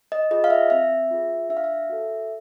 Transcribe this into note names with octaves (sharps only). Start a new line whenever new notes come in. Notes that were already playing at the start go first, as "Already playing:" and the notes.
D#5
F4 G#4 D#5
F5
E5
C4 E5
F4 G#4
D4 E5
F5
E5
F#4 A4